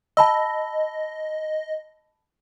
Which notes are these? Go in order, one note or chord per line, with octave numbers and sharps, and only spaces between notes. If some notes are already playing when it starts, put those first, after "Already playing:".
D#5 A5 B5 E6